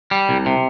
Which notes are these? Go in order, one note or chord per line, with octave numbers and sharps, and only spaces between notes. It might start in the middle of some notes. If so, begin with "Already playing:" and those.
G3
C2
C3